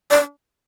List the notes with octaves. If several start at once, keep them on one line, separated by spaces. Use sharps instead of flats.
D5